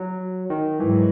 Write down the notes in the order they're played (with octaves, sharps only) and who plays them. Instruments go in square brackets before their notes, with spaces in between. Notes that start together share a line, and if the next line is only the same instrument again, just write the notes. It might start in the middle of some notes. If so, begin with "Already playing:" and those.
Already playing: [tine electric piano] F#3
D#3
[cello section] G#2 F#3 [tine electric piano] E3